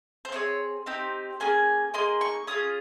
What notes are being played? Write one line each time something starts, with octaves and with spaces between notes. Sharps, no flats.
C5
C4 D#4 G#4 C#5
C4 D#4 G4
A#3 C#4 G#4 G#5
A#3 D#4 G#4 C6
C#6
C#4 F4 G#4 D#6